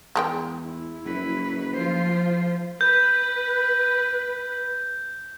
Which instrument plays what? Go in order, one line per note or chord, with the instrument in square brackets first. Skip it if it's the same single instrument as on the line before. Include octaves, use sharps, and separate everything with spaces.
[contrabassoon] E2 [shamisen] G#3 A#4 G5
[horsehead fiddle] E4
[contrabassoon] F#1 [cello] F#3 B4
[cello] F3 F4 [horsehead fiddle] C5
[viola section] B4 [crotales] G6